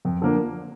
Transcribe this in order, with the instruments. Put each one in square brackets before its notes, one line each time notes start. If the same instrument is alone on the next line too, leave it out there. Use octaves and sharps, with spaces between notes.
[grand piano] F2
D3 F3 A#3 D4